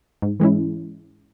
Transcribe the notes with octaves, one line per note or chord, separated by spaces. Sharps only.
G#2
E3 G#3 C#4 E4